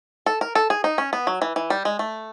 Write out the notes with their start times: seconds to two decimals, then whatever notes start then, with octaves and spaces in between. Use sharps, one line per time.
0.26 A4
0.41 A#4
0.55 A4
0.70 G#4
0.84 D#4
0.98 C#4
1.13 B3
1.27 F#3
1.42 E3
1.56 E3
1.70 G3
1.85 G#3
1.99 A3